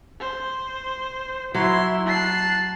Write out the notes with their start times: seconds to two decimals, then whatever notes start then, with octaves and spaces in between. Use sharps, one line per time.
0.20 C5
1.55 F#3 E4 C6
2.08 A5 F#6 C7